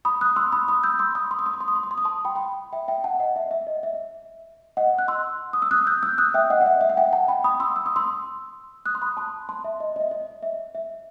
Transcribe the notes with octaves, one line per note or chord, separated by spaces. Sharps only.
B5 D#6
D#6 F#6
C6 E6
B5 D#6
B5 D#6
E6 G6
C6 E6
B5 D#6
C6
D#6
C6
D#6
C6
D#6
C6
D#6
C6
D#6
A5 C6
G5 B5
G5 B5
E5 G5
E5 G5
F#5 A5
D#5 F#5
E5
E5
D#5
E5
D#5 F#5
F#6
C6 E6
D#6
E6
D#6 F#6
E6 G6
E6 G6
D#6 F#6
E5 G5
D#5 F#5
F#5
E5
E5
F#5
E5 G5
F#5 A5
G5 B5
B5 D#6
C6 E6
E6
D#6
C6 E6
D#6 F#6
C6
B5 D#6
A5 C6
A5 C6
E5
D#5
D#5
E5
D#5
E5
E5